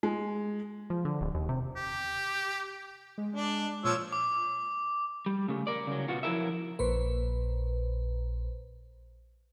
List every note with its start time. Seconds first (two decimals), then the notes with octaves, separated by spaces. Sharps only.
0.03 G#3
0.90 F3
1.05 D3
1.21 D1
1.35 D#2
1.49 C3
1.76 G4
3.18 G#3
3.36 D4
3.85 A#2 F3 C#5 E6
4.13 D6
5.26 G3
5.48 C#3 A3
5.67 A#4 D5
5.87 C#3 F#3
6.08 B2 B3 F4 F#4
6.23 F3 F#3 E4 A4 A#4 E5
6.79 A#1 A#2 B4 C5